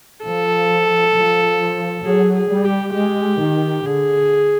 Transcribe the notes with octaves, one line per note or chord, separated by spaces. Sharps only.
F3 A4
F3
F#3 G#4
G#4
G3
G4
G#3 G4
D#3
D3 G#4